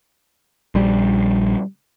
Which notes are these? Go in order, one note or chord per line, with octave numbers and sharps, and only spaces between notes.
A#1 G3